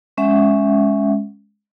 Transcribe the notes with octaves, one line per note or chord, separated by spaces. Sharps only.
G#3 C#4 E5 F#5